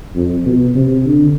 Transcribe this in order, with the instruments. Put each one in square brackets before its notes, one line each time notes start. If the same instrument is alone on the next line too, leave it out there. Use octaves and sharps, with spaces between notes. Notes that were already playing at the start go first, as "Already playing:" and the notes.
[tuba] F2
B2
C3
D3